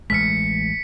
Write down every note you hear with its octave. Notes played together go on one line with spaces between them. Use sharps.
A1 G#3 B6 C#7